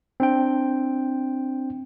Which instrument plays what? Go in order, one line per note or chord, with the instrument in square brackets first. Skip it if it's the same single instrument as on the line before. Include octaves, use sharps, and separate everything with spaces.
[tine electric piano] C4 D4 G5